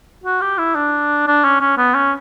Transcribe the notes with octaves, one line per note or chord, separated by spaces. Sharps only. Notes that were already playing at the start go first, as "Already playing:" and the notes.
F#4
G4
E4
D4
D4
C#4
C#4
B3
C#4